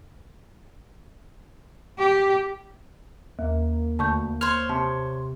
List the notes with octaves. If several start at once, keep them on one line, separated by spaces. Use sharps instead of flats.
G4
D#2 A#3
D2 A5 C#6 G6
C5 C#5 F6
C3 A5